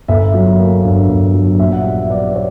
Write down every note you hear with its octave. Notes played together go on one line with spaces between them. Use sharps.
G1 E5
F#3
A#3
G2
G1
F#3
A#1 E5
F#5
G3 E5
B3 D5
C#5